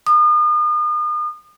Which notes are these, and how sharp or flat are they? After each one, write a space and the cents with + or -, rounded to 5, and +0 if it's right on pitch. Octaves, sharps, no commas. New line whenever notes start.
D#6 -40